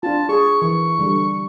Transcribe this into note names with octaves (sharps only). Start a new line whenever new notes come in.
D4 F4 A5
G#4 C#6
E3 C#6
D3 G3